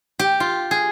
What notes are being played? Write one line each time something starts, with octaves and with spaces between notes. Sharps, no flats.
G4
F4
G#4